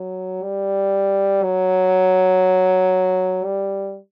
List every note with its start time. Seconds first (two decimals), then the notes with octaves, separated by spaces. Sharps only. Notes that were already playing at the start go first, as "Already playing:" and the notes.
Already playing: F#3
0.43 G3
1.43 F#3
3.44 G3